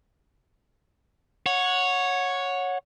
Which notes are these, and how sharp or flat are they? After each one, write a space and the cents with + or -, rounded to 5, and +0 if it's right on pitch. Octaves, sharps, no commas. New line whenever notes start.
C#5 +0 F#5 -20